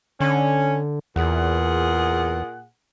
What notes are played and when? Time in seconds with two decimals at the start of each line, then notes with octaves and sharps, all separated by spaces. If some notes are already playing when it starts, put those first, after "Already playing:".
0.20 D3 C#4
1.16 E2 A#2 G#4 F#5